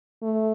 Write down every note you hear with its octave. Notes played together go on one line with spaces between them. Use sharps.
A3